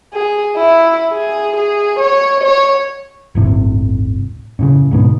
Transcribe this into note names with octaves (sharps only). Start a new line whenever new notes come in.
G#4
E4
G#4
G#4
C#5
C#5
D1 G1 A2 C3
F#2 A2 C#3
D2 G#2 B2